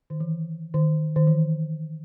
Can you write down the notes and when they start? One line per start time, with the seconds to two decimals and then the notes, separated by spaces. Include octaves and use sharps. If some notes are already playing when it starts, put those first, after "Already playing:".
0.10 D#3
0.20 E3
0.74 D#3
1.16 D#3
1.27 E3